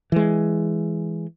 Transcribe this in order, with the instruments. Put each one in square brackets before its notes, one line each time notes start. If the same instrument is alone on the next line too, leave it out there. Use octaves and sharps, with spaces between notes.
[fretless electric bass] E3 G#3